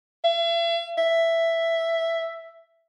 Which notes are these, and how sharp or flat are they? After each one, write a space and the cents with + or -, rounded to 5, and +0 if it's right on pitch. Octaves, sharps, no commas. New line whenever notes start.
E5 +45
E5 +5